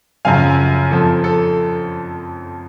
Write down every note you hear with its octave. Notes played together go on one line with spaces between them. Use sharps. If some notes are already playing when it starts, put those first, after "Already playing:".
F#2 C#3 F3 F5 G#5
F2 F3 A4
A4